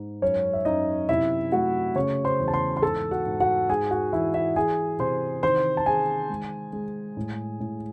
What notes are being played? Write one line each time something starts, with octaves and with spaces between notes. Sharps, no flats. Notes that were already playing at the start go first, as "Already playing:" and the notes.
Already playing: G#2
F#2 C#4 C#5
E5
F#2 D#4 D#5
C3 E4 E5
A3 F#4 F#5
C#3 C#5 C#6
C5 C6
E2
A5
C5 C6
C6
G#2 A4 A5
F#4 F#5
G#2
F#4 F#5
G#2 G#4 G#5
F#4 F#5
E3 E4 E5
E4 E5
E3 G#4 G#5
C3 C5 C6
D#3 C5 C6
A5
D#3 G#4 G#5
G#3
G#3
A2
A2